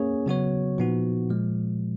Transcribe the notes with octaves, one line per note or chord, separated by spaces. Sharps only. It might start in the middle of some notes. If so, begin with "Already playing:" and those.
Already playing: A#3 C#4 G#4 C#5
C#3 F#3 B3 F#4 C#5
A#2 F3 B3 D#4 F#4
A#2 F3 G#3